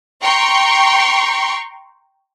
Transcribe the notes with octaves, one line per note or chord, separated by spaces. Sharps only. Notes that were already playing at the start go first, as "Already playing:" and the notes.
G5 A#5 C6 C#6